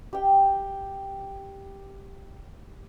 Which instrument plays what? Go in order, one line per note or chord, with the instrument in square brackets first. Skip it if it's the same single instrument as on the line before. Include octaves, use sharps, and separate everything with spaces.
[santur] G4 G5